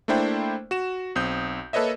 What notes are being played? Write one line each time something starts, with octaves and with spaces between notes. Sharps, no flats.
A3 A#3 D4 E4 C5 G5
F#4 E7
B1 C4 D#6 G6
A#3 A4 B4 C#5 D#5 E5